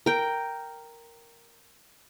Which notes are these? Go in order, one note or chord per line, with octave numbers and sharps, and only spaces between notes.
A#4 G5